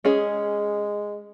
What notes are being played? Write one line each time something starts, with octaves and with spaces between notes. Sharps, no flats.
G#3 C#4 G#4